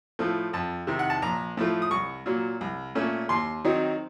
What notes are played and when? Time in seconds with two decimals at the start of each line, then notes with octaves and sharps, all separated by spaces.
0.19 A2 F3 A3
0.53 F2 A5
0.87 C3 D#3
0.99 F#5
1.10 A5
1.22 A#1 A#5
1.57 A2 F3 A3
1.82 D#6
1.91 C2 C#6
2.26 A#2 F#3
2.61 C2
2.95 A#2 A3 C#4
3.29 D#2 C6
3.65 D#3 F#3 C4 D#4